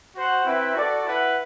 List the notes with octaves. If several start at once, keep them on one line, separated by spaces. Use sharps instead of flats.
F#4 C5 F#5
C4 E4 B4 E5 G5
F#4 A4 D5
E4 B4 F#5